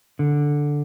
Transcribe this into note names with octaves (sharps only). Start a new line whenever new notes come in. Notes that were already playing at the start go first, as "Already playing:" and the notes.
D3